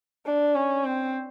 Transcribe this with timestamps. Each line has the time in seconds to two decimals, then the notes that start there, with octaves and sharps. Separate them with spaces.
0.26 D4
0.55 C#4
0.85 C4